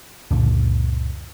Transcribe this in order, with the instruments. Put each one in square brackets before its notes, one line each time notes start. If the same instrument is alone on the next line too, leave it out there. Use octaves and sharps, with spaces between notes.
[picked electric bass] C#2 F#2 A#2 D3